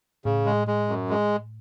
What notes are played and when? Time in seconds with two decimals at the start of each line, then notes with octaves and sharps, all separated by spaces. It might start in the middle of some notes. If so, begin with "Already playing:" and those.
0.25 A2 C#3
0.46 G#3
0.68 G#3
0.88 F#2
1.09 G#3